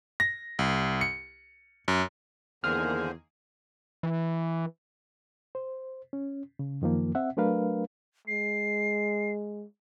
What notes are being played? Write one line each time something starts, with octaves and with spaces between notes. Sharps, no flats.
A#6
C2
C#7
F#2
E2 D3 D#3 A#3 G#4 C5 F6
E3
C5
C#4
C#3
F#2 D#3 F3 A#3
C4 E5 F#5
F#3 A3 D4 A#4 B4 F5
G#3 C7